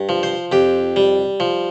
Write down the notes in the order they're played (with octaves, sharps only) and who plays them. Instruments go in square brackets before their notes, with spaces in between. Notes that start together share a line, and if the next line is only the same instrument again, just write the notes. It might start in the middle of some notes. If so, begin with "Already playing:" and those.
Already playing: [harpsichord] G2
F3
C5
F2 G4
G3
F3